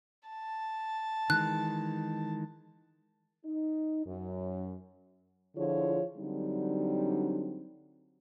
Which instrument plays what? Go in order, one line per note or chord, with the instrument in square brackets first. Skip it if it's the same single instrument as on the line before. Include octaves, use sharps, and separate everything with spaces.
[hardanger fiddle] A5
[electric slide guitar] D#3 E3 G#3 [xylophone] F#6
[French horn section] D#4
F#2
D3 F3 E4 F4 G#4 C#5
D3 F#3 G3 C4 D4 D#4